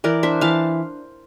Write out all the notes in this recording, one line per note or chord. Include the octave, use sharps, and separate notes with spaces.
E3 A#4 D5
D4 C5 E5
E3 F5 A5